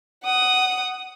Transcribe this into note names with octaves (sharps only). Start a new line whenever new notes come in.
F#5 D#6